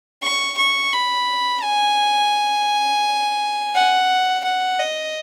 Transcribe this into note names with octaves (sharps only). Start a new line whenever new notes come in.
C#6
C#6
B5
G#5
F#5
F#5
D#5